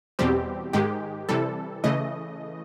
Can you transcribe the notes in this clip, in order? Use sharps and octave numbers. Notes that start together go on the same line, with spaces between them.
E2 B2 G3 C4 G4
G#2 D#3 G#3 G4
C3 E3 G3 A4
C#3 E3 A3 D#5